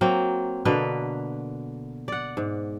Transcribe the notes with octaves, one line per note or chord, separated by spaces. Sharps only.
F#3 A#3 C4
B2 D3 A#3 B4
D5 F#5
G#2